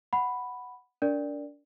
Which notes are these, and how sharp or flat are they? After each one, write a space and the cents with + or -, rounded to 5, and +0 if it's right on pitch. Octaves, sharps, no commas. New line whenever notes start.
F#5 +0 B5 +0
D4 -30 A#4 +0 D5 +0